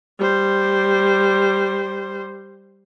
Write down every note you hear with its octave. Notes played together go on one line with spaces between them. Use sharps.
G3 C5